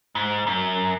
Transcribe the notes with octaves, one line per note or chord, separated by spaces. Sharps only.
G#2
F#2